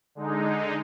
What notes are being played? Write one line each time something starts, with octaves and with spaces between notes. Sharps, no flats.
D3 G#3 D#4